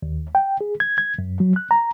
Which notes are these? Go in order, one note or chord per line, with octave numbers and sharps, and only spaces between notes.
D#2
G5
G#4
G#6
G#6
F#2
F#3
F#6
A#5